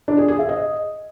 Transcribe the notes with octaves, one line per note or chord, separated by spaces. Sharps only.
D4
G#4
G#4
E5
D#5